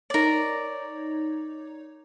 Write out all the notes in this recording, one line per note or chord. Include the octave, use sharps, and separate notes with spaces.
D#4 A#4 C#5 D5